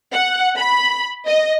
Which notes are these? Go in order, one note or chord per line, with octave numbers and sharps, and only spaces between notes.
F#5
B5
D#5